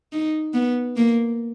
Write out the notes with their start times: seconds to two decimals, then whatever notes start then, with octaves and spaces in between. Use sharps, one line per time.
0.12 D#4
0.54 B3
0.97 A#3